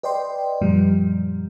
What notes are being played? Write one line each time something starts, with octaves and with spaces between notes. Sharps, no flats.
B4 D5 D#5 G5 C6
F#2 A#2 F3 G3